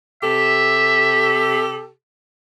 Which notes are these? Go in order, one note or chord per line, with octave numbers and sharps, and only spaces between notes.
C3 G4 A4 E5